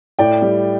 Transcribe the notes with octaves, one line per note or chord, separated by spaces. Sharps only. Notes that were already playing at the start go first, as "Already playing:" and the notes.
A2 D5 G5
G3